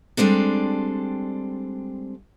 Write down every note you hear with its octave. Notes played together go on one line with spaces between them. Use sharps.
G3 G#3 C4 D4 A4